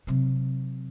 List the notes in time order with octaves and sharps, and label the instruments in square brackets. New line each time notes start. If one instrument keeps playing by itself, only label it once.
[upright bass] C3 F#3